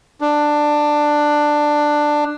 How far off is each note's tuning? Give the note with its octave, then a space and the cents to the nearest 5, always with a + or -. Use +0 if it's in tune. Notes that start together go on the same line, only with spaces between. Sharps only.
D4 +10